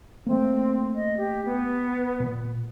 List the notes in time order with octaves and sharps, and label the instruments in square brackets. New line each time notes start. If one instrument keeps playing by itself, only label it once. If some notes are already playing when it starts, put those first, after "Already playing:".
[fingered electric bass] A3 A#3 [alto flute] C4
[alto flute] D#5
G4
B3
[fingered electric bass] A#2